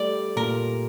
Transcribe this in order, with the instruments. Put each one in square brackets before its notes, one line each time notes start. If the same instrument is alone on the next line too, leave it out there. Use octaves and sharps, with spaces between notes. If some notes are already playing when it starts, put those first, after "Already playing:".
Already playing: [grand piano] G3 A3 [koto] D5
[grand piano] A#2 [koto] A#4